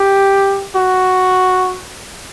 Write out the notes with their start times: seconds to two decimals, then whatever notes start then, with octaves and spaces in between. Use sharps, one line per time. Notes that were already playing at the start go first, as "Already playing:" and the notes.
Already playing: G4
0.76 F#4